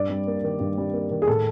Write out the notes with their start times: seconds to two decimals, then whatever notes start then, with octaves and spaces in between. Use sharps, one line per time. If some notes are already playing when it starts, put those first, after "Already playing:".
Already playing: G2 D5
0.10 G3
0.27 A#3
0.44 D#3
0.60 G2
0.78 G3
0.93 A#3
1.10 D#3
1.22 G#4
1.27 A2 A4